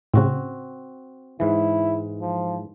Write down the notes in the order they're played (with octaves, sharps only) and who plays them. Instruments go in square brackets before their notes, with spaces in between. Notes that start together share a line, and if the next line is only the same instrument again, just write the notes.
[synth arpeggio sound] A2 C#3 [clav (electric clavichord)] C4 F#4
[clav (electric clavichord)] G#2 E3 [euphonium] E4
[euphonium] F3